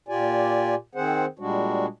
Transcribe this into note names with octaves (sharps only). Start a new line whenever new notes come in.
A#2 F4 G4 D5 G#5
D#3 C4 G#4 C5 F#5
A#2 G3 G#3 D4 F#4